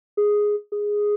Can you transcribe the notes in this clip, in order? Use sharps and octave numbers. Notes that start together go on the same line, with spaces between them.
G#4
G#4